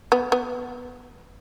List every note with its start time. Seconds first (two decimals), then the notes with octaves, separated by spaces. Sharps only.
0.12 B3
0.32 B3